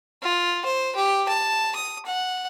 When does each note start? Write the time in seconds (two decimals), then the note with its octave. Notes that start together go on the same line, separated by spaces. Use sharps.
0.22 F4
0.65 C5
0.96 G4
1.29 A5
1.76 D#6
2.06 F#5